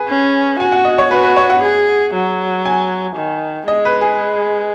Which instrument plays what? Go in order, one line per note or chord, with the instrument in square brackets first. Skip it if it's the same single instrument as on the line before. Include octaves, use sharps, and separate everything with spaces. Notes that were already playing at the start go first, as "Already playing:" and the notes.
Already playing: [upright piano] G#4 B4
[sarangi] C#4
[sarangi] F#4 [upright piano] G#5
[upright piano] F#5
D#5
C#5
[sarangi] F#4 [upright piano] B4
[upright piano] B4
C#5
F#5
[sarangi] G#4
F#3
[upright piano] G#5
[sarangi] D#3
[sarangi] G#3 [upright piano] D#5
[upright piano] B4
G#4